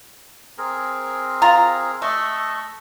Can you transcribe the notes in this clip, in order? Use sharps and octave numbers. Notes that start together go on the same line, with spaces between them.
C4 G#4 A#4
F4 A#5
A3 D#5 C#6 E6